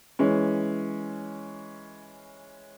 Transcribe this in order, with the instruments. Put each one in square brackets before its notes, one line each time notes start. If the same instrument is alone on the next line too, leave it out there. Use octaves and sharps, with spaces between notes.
[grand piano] E3 G#3 C#4